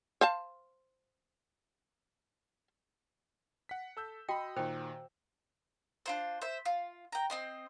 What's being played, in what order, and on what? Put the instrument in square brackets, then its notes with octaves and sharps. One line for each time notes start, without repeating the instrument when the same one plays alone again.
[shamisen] C5 F5 A5
[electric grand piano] F#5 B6
A4 E6 G6
[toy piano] F#4 G5 [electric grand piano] D#5 B5
[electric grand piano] A#2 D#3 [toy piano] C5 G5
[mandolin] D4 F4 C5
C5 E5
F4
G5 A#5
C4 D#5 C6